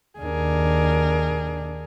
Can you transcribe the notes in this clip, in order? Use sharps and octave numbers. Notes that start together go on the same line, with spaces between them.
D#2 D4 G#4 A#4